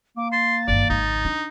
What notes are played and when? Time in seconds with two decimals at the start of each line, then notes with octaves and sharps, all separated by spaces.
0.17 A#3 D6
0.32 C6 A6
0.68 G1 D#3 D5
0.90 G#1 C#2 D#4
1.25 D4